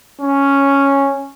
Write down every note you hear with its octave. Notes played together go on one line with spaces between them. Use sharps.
C#4